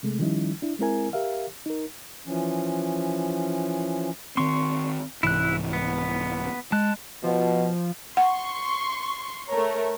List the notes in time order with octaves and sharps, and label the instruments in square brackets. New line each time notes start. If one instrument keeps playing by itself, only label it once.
[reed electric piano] C3 G#3 A3
D#3 F3 G3 C#4 D#4 E4
D4 E4
G#3 C4 E4 A#4 G#5
G4 A#4 E5 F5
D#4 A#4
[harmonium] E3 F3 C#4
[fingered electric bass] D#3 C4 [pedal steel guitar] C6 C#6
[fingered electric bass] C2 G#2 E3 [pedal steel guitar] E4 F#6
[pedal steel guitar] B3
[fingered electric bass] G#3 [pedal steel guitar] A5 F#6
[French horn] B2 [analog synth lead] F3
[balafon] F#5 [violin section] C6 C#6
[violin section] A3 A#4 C#5